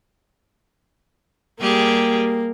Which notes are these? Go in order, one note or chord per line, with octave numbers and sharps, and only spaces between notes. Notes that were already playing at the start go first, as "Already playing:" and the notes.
G3 A#3 G4 G#4